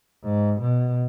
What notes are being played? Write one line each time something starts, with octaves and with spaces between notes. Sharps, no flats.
G#2
B2